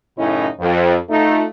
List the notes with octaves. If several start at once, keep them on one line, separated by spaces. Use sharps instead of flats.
F#2 A2 C#3 C#4 D#4 E4
F2
A3 D#4 F4